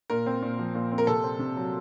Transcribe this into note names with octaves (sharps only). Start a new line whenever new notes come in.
A#2 A#4
C4
A#2
F3
A#2
C4
A#4
C3 A4
C4
C3
F#3